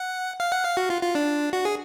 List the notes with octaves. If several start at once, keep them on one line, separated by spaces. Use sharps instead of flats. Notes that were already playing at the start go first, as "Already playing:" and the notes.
Already playing: F#5
F5
F#5
F5
F#4
F4
F4
D4
F#4
G#4